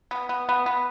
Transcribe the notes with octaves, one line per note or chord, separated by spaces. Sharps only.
B3
B3
B3
B3